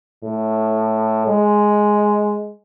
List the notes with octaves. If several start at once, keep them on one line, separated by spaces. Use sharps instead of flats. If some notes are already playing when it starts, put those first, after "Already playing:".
A2
G#3